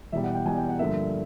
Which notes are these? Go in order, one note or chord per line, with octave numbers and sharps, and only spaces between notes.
E2 B2 G3 E5
F#5
G5
E2 B2 G3 G#5
G5
F#5
G2 D3 F3 A#3 E5